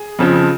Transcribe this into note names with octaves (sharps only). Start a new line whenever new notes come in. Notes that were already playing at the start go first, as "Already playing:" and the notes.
Already playing: G#4
F2 C#3 F3